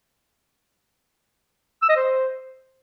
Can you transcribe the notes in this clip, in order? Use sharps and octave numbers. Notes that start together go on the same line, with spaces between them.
E6
D#5
C5